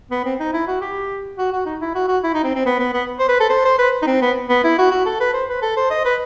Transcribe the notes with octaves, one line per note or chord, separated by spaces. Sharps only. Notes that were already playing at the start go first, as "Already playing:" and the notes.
B3
C4
D#4
E4
F#4
G4
F#4
F#4
D#4
E4
F#4
F#4
E4
D#4
C4
C4
B3
B3
B3
C5
B4
A4
C5
C5
B4
D#4
C4
B3
B3
E4
F#4
F#4
A4
B4
C5
B4
A4
C5
D#5
B4